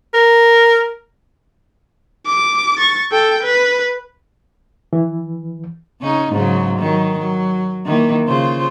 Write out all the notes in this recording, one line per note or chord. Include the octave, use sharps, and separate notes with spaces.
A#4
D6
C#6 A6
A4 G5
B4
E3
C#3 C#4 D#4
G#2 C#3 F#3
D#3 F#3
F#3
D#3 E3 A#3
C#3 F4 C5